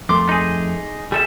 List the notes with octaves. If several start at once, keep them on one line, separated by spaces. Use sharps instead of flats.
F2 A3 C6 D6
D#4 G#4
G3 G#4 A4 E5